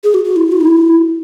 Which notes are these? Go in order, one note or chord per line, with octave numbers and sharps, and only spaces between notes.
G#4
F#4
F#4
E4
F#4
D#4
E4